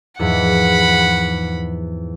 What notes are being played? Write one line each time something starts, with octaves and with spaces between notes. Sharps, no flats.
E2 G#2 F3 F#5 B5